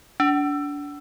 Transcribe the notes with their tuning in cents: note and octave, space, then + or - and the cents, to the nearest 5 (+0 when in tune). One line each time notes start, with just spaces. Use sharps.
D4 -30